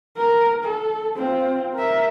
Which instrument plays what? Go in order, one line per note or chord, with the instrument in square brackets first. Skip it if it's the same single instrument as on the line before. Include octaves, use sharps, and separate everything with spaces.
[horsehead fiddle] A#4
A4
C4 F4
A#4 E5